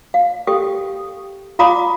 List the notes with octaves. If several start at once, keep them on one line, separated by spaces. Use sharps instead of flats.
F5
G4 A4 G5 C#6 D#6
F4 F5 A#5 B5 D6 D#6